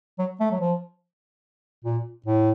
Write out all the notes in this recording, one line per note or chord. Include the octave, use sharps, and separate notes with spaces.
F#3
A3
F#3
F3
A#2
A2